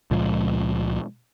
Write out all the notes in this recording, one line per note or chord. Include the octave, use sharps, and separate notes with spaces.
C#2 A#2 F3 G#3